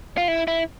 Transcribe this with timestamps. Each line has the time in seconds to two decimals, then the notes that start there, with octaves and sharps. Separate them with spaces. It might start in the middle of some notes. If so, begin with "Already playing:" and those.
0.17 F4
0.28 E4
0.48 E4